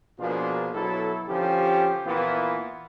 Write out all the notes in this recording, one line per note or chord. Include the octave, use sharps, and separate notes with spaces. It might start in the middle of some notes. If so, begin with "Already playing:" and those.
B2 F3 A#3 D4 F4 G#4
B2 F#3 E4 A4
D3 F3 C#4 G4
A#2 E3 A#3 B3 E4 F4